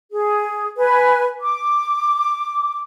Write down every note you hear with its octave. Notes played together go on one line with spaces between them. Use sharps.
G#4
B4 G#5
D6